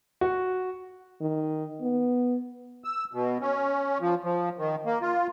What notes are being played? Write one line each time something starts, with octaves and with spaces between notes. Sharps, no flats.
F#4
D#3
B3
E6
B2
C#4
F3
F3
D#3
A#3
F4